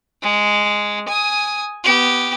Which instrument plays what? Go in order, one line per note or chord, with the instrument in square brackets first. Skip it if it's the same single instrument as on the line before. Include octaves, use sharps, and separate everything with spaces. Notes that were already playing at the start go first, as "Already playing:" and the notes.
[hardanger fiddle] G#3
G#5 D#6
B3 G4